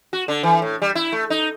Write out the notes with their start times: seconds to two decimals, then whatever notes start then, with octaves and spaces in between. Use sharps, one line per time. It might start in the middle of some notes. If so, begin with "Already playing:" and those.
0.13 F#4
0.28 D3
0.43 E3
0.62 A2
0.82 G3
0.95 E4
1.12 A3
1.30 D#4